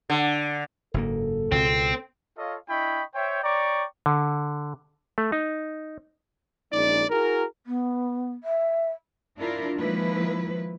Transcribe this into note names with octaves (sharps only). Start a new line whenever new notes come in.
D3
F#1 G#2 A#3 A4
C#2 B2 C4
F4 A4 C#5 D#5 F5
D4 E4 D#5 G5 B5 C#6
C5 C#5 E5 G5
C#5 D5 G5 A#5 C#6 D6
D3
A3
D#4
A#1 G#3 C#4 D#4 D5
E4 F#4 G#4 A#4
B3
E5
D4 E4 F4 A#4
D#3 F3 G#3 A#3 E4 B4